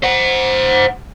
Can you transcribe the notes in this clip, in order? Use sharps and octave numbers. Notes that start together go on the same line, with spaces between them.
C5 F#5